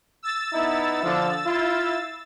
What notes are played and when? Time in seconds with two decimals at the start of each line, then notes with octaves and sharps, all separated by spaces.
0.23 E6 A6
0.53 B3 D#4 E4
1.04 D3 F3
1.45 E4 F4